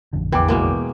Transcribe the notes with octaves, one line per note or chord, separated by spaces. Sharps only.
A1 F2 D3
E2 E3 G5 D6
B2 G#3 A#3